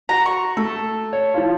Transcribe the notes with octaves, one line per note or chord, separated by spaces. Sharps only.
F#4 A#5
C#6
A3 A4
C#5
F3 E4 F4